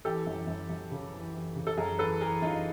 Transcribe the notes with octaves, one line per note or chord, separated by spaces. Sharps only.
E3 G4 A4
F#2
F#2
F#2
C#3
E3
E3
C#3
A4
F#2 G#4 A#4
E3 A4 B4
E3 G#4 A#4
F#2 D#4 F4